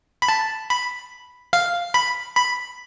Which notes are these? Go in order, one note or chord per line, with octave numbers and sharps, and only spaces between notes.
B5
A5
B5
F5
B5
B5